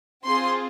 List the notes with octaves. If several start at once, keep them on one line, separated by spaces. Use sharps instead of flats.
C4 F4 G#4 C6